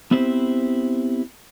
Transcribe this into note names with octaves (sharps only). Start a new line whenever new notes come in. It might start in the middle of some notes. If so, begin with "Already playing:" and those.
B3 C4 E4 G4 C5